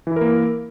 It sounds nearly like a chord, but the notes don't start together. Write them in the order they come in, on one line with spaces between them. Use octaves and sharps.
E3 E4 A#4 A#3